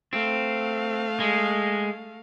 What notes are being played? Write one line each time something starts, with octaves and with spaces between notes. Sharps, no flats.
A3 C4 F5
G#3